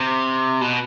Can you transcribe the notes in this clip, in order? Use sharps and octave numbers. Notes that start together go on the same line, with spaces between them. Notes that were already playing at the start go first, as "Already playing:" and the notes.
Already playing: C3
B2